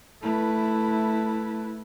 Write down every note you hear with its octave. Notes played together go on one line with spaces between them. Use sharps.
A3 E4 B4